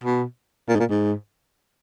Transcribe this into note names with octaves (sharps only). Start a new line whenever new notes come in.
B2
A#2
G#2
A#2
G#2